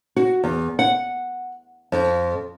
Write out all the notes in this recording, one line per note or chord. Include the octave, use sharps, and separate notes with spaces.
F#4
E2
F#5
F2